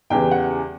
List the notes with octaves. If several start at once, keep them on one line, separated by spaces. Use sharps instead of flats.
E2 C#3 E3 G3 G5
F#5